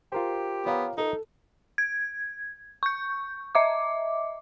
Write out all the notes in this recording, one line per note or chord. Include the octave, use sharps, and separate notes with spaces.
F4 G4 A#4 C5
B3 C#5 F5 A#5
D#4 A4
G#6
C#6 G6
D#5 E5 D6